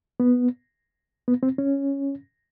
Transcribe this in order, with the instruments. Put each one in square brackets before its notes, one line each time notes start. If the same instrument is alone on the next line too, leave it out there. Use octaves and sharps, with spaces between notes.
[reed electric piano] B3
B3
C4
C#4